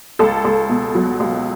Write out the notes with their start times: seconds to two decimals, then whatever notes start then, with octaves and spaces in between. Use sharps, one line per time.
0.19 C#2 A4
0.45 C#2
0.69 B2
0.95 F#3
1.20 C#2